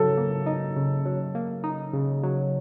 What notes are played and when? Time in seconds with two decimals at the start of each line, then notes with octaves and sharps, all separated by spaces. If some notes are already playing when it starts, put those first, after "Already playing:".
Already playing: C#3 F#3 A4
0.17 A#3
0.46 D#4
0.76 C#3
1.05 F#3
1.35 A#3
1.64 D#4
1.93 C#3
2.23 F#3